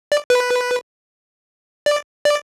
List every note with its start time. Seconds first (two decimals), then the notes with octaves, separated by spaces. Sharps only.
0.12 D5
0.30 B4
1.86 D5
2.25 D5